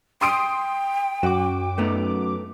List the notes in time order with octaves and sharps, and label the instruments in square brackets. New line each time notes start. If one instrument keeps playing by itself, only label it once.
[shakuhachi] G5 [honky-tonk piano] C6 D#6 D7
[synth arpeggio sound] F#2 D6 [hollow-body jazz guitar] F#4
[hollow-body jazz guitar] A3 B3 D#4